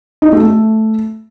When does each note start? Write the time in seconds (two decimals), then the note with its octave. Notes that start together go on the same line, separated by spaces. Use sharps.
0.22 D#4
0.33 A3
0.43 A3